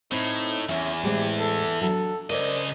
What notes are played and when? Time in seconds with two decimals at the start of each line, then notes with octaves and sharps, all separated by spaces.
0.12 A2 C4 D#4
0.69 E2 C#4 E5
1.03 A2 G#3 C4 G4
1.39 A4
1.81 F#3 D4 A4
2.30 C#3 A#4 C5 D5 D#5